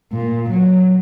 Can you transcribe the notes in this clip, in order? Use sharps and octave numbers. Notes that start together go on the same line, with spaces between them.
A#2
F#3